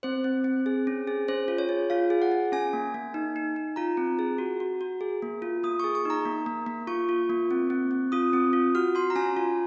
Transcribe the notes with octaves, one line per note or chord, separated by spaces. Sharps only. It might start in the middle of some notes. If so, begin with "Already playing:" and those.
C4 C5
C4
C4
G#4
C#4
G#4
C#4 C5
F4
C#5
G#4
F4 F5
G#4
F#5
G#4
C#4 G#5
A#3
A#3
D#4
D#4
D#4
F4 A#5
C4
G#4
F#4
F#4
F#4
G#4
A#3
F4
A#3 D#6
G#4 C#6
C#6
D#4 A#5
A#3
A#3
A#3
F4 C#6
F4
A#3
C4
C4
C4
F4 D#6
C4
F4
F#4 F6
F#4 C6
A#5
C#4 G#5
F4